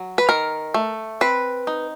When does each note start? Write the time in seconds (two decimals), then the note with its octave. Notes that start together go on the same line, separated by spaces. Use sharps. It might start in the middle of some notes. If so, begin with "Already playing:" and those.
Already playing: F#3
0.18 B4
0.29 D#3 A#4
0.74 A3
1.21 C4 B4
1.67 D#4